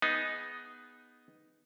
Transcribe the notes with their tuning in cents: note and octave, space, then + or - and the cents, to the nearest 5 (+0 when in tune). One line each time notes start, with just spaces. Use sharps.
B3 +0 D#4 +0 G#4 +0